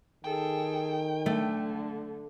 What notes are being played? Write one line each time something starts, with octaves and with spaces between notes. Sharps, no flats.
D#3 G#4 A4 G5
D3 A3